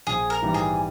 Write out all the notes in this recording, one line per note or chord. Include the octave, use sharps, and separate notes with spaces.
A#1 G#4
A#4
G#2 E3 G3
G#4